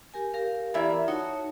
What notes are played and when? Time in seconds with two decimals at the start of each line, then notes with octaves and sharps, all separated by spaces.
0.14 G4 A#4 G#5
0.34 G4 A#4 F5
0.74 E2 A#3 E4 D5 E5 B5
1.08 D#4 F#4 C#5 A5